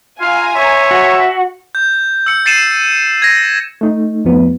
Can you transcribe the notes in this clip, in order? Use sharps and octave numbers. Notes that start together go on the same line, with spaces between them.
F4 F5 G#5 A#5
C#5 E5
F#4
G6
E6 C#7
A6 C7 C#7 D#7 E7
G#6 A#6 D#7
A3 D#4
F2 F3 B3